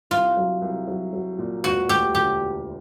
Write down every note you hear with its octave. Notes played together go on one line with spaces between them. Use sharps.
C2 F4
F#3
C2
F#3
F#3
A#2
E1 F#4
D2 G4
D3 G4